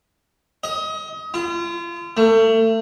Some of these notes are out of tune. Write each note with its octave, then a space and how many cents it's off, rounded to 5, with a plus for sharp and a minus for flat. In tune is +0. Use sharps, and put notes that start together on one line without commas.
D#5 +30
F4 -35
A3 +30